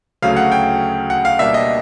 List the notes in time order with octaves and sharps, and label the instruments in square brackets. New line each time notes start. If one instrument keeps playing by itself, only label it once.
[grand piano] D2 C#3 F#3 A3 C#4 F5
F#5
G5
F#5
F5
B2 G3 A#3 D4 E5
D#5